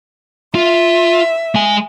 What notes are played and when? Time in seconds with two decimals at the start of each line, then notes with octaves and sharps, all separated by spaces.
0.55 F4 E5
1.55 G#3 G#5